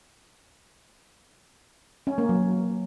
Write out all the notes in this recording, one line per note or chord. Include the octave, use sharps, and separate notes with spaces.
C#4
A#3
F#3